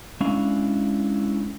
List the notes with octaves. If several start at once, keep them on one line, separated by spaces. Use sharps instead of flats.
G#3 C#4 D4 E4 F5